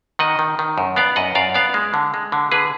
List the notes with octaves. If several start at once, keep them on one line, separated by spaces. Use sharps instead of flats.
D#3 D#5 F#5
D#3
D#3
F#2
B3 D5 F5
F#2 D#5 F#5
F#2 D5 F5
B3 D5 F5
G#3
D3
G#3
D3
D3 G#4 B4